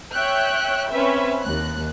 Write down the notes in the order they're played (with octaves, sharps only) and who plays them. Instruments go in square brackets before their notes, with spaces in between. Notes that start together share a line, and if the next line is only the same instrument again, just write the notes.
[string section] C#5 E5 G5 F#6 G6
C4 C#4 B4 E5
D#2 F#6